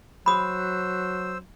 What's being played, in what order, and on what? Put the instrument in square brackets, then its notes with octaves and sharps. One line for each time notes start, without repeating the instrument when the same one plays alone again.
[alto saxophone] F#3 [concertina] C5 E6 [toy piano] B5 D#6